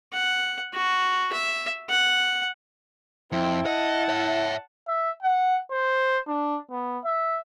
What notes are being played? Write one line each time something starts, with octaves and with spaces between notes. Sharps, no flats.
F#5
F#4
E5
F#5
F2 C4 E4
D#5 F#5 A5
C#5 E5
E5
F#5
C5
D4
B3
E5